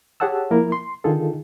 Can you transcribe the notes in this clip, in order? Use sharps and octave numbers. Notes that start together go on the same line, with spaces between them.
G4 G#4 C#5 F#5 A5 E6
F3 A#3 E4 A#4
C6
D3 D#3 D#4 F4 G#4 A4